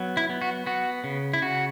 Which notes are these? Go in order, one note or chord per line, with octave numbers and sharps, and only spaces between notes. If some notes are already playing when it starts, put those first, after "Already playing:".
Already playing: F#3 B3
E4
B3
F#4
B3 F#4
C#3
E4
C#3 F#4